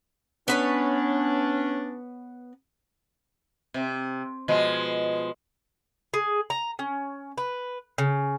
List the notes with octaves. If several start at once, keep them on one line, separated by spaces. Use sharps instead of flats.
B3 C#4 D4 B4 C#5
C3
B2 F3 G#3
G#4
A#5
C#4
B4
C#3